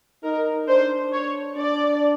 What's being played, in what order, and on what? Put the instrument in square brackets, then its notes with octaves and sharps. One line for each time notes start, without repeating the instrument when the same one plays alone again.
[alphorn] D#4 [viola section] A#4
[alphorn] D4 [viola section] C5
[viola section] C#5
[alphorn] D4 [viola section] D5